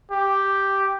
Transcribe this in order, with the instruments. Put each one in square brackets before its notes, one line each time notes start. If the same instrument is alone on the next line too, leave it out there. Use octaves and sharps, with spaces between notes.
[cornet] G4